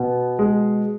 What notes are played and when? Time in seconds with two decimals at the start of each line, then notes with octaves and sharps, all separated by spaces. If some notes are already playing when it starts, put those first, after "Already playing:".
Already playing: B2 B3
0.39 G#3